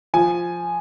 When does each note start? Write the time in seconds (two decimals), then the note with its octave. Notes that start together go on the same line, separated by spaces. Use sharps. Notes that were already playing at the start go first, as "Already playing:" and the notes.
0.14 F3 G#5